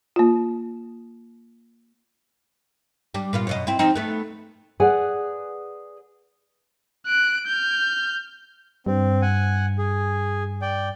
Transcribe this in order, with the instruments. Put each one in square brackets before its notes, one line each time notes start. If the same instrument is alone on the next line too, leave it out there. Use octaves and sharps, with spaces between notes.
[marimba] A#3 F4
[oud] G3 D4
A#2 B3 F4
F#2 B2 D#5
C4 E4
F3 C4 D#4
A3 B3
[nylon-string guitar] G#4 B4 D5 F#5 G#5
[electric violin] F#6 D7
F6 G6
[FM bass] G2 [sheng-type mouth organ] C4
[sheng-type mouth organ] F#5 G#5
G#4
D5 G5